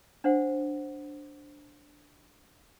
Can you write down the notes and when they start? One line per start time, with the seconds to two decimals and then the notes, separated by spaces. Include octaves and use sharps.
0.24 D4 C5 F#5